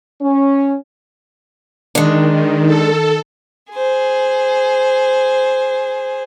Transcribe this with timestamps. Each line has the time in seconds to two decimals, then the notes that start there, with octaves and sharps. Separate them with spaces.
0.22 C#4
1.95 D#3 G#3 D4
2.32 D#3
2.66 A4
3.73 G#4 C5